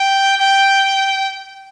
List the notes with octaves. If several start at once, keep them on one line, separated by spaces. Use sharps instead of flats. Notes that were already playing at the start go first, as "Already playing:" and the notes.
Already playing: G5
G5